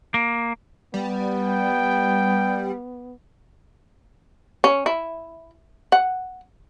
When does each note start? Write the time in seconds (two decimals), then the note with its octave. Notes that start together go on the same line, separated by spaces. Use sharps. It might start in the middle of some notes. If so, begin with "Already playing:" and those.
0.14 A#3
0.94 G3 B3
1.45 G5
4.64 C#4
4.86 E4
5.92 F#5